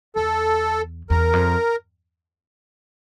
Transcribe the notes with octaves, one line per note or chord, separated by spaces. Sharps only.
E2 A4
E2 A#4
F2